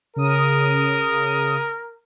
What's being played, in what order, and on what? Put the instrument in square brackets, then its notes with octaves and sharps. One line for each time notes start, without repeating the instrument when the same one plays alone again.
[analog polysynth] C#3 D#6 [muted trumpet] A#4